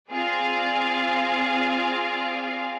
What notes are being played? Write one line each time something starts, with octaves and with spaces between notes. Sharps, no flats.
C4 F4 G#4 D5 F5